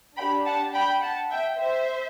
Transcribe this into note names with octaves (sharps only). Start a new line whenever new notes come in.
D4 G4 G5 B5
F#5 A5
G5 B5
F#5 A5
E5 G5
C5 E5